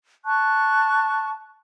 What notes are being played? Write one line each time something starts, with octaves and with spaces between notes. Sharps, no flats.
A5 C#6 F#6